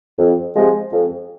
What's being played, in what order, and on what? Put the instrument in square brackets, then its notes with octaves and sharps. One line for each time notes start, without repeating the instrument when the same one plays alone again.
[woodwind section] F2
C3 F3 G#3
F2